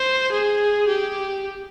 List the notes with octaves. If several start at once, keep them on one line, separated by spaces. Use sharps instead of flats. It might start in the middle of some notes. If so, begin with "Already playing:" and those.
Already playing: C5
G#4
G4